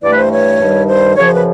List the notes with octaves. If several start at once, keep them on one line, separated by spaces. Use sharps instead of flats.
G2 E3 A3 D5
B4
C5
C#5
G2 D#3 G3
C5
F#2 C#3 F3 C#5
C5
B4